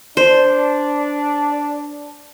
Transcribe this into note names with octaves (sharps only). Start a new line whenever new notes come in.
D4 C5